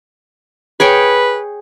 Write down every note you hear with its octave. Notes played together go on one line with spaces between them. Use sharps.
G#4 B4 C#5 G5